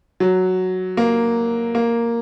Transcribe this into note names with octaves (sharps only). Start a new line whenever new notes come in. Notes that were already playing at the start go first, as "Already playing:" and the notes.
F#3
A#3
A#3